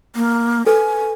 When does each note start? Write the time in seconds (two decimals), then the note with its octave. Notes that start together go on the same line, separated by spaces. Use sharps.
0.16 A#3
0.66 A4 B4 G#5